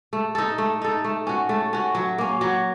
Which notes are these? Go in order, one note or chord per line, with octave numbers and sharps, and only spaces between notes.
A3
D#4 A4
A3
D#4 A4
A3
C#4 F#4
A3
C#4 F#4
F#3
A#3 C#4
F#3